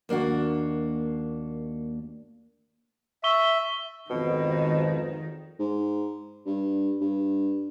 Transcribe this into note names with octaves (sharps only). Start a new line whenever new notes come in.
D#2 A#3 D4 F#4
E5 C#6 G7
G#1 F2 B2 D#3
G#2
G2
G2